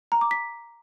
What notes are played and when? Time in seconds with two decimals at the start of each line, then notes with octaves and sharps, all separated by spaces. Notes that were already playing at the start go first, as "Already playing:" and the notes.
0.12 A#5
0.21 D6
0.31 B6